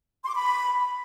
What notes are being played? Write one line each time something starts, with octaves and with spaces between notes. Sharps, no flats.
C6
D6
B5